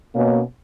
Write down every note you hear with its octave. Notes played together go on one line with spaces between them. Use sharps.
B2 A#3 C#4